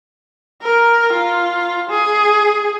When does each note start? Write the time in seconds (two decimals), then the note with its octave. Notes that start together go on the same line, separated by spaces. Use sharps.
0.62 A#4
1.14 F4
1.90 G#4